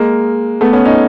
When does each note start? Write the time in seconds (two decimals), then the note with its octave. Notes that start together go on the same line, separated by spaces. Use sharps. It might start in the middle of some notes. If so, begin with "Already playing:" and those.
Already playing: G#3 A#3
0.61 A3 B3
0.73 B3 C#4
0.85 C#4 D#4